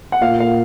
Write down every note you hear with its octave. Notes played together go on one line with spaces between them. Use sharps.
F#5
A#2 F5
A#2 F5